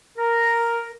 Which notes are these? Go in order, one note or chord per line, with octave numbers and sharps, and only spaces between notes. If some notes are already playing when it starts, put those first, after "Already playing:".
A#4